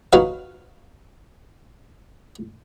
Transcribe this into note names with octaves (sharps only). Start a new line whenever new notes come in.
F#3 D#4 F#4 B4 F5